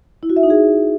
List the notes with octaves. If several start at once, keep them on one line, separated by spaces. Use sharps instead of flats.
E4
F#4
E5
D#4
G#4